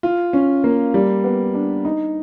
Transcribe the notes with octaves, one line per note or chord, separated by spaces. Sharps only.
F4
C#4
A#3
G3
B3
D4
D#4